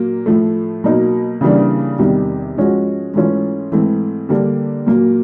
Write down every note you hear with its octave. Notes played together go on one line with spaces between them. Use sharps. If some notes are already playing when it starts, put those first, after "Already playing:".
Already playing: A#2 F#3 A#3
A2 F3 A3
B2 F#3 A#3 D#4
C#3 E3 G3 A#3 D4
E2 C3 D#3 G3
G#2 F3 G#3 C#4 F#4
G#2 E3 A3 C#4 F4
G#2 E3 A3 C4 E4
D3 G3 A#3 D4 G4
A#2 F#3 A#3